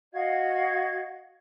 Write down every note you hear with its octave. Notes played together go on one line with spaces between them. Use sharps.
F#4 D#5 F5 G#6